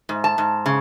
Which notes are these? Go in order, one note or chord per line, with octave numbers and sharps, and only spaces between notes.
G#2
A5
G#2
C#3